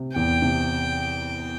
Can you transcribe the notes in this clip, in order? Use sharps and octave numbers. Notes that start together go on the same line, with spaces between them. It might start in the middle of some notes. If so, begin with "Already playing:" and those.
Already playing: C3
E2 G5
C3